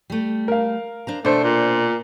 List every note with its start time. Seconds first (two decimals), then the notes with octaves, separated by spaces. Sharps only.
0.10 G3 A3
0.48 A#4 F5
1.07 D4 C5 A#5
1.25 B2 A3 D4 C5
1.43 A#2